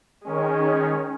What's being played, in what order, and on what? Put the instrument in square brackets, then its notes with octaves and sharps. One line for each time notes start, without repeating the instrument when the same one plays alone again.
[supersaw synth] D#3 C#4 [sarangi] G#3